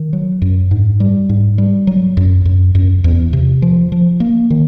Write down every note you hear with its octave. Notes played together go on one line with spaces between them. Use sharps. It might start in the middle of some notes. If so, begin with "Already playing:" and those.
Already playing: D#3
F#3
F#2
G#2
G3
G#2
G3
F#3
F#2
F#2
F#2
E2
C3
F3
F3
A#3
D#3